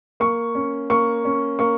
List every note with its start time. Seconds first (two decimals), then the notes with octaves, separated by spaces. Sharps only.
0.20 A#3 C#6
0.55 C#4
0.90 A#3 C#6
1.25 C#4
1.59 A#3 C#6